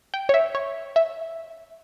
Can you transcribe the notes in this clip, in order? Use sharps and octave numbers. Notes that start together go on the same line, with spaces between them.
G5
C#5
E5
C#5
E5